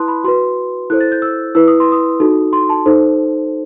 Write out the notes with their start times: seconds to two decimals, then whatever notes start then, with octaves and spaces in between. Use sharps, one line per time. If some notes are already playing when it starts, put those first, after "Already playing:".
Already playing: E4 B4 A5 C6 D#6 F#6
0.08 B5
0.24 F#4 B4 C6
0.90 E4 A4 C5 F#6
1.00 A6
1.12 G6
1.22 E6
1.55 E4 B4 E6
1.68 D#6
1.80 C6
1.92 D#6
2.20 D#4 F#4 A4
2.53 C6
2.69 A5
2.86 D#4 A4 C5